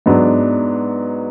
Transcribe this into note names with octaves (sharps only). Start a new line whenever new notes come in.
G#2 F#3 B3 D4